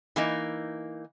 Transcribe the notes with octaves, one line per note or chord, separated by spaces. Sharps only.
E3 A#3 D#4